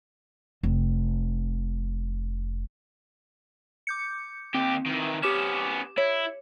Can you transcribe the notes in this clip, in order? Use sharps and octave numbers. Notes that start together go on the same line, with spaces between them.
F1 C4
D6 G6 C#7
D#2 C4 G4
D#3 E3
B3 C#4 G4 D6 E7
E4 C#5